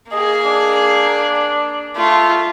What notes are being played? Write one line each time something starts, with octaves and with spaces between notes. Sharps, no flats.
A#3 G#4 D#5
D4
A3 F4